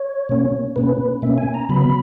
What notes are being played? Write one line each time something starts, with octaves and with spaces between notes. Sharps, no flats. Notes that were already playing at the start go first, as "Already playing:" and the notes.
Already playing: C#5
B2 A#3 C#4
B2 A#3 C#4 B4
B2 A#3 C#4 E5
G#5
A#5
C#3 F#3 B3 B5